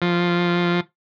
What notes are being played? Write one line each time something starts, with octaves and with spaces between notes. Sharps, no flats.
F3